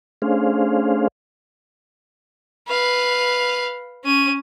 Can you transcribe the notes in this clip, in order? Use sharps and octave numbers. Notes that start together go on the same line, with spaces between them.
A3 C#4 D4 G#4 C5 F5
B4 F5
C#4 D#7